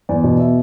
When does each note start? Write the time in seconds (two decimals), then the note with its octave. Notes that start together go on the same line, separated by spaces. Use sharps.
0.09 E2 D5
0.24 B2
0.39 E5